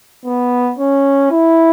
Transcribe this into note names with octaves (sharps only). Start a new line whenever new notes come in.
B3
C#4
E4